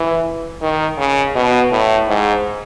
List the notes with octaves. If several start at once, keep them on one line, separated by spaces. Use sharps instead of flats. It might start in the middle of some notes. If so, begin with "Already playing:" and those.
Already playing: E3
D#3
C#3
B2
A2
G#2